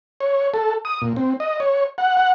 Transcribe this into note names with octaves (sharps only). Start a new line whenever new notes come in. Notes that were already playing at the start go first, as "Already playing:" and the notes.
C#5
A4
D#6
A#2
C4
D#5
C#5
F#5
F#5